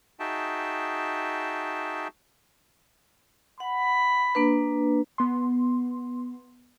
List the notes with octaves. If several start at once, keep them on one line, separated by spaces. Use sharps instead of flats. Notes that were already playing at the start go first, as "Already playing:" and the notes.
D#4 F#4 G#4 E5 G5 A5
F#5 B5
A#3 D4 B4
B3 C6